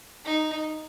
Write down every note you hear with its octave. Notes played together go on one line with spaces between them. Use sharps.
D#4